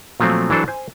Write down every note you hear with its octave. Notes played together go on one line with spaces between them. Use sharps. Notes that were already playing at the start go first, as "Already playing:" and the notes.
A#2 F3 F#3 A3 C4
E3 F#3 D4 A4 C5
C5 G#5